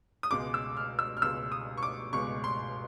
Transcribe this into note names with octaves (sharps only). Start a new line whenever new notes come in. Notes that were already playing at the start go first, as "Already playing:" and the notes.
D#6
C#2 B2 G#3 D6
E6
F6
E6
F6
C#2 B2 G#3 E6
D#6
C#6
D6
C#2 B2 G#3 C#6
C6